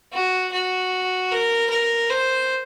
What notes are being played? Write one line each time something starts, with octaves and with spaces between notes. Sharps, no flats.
F#4
F#4
A#4
A#4
C5